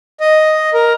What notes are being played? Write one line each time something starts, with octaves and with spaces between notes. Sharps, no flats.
D#5
A#4